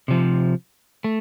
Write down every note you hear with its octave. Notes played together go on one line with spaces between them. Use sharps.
C3 F3
A3